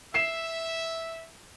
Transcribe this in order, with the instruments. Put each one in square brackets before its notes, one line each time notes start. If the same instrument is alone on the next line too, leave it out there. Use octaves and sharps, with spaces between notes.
[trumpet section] E5 [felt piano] C7 E7